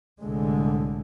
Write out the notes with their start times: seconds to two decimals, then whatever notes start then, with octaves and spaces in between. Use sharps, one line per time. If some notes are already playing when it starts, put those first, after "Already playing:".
0.20 C2 A2 D3 G#3